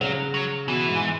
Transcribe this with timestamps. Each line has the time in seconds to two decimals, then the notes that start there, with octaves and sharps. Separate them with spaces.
0.01 C#3 F#3
0.34 F#3
0.67 B2 E3
0.89 G#2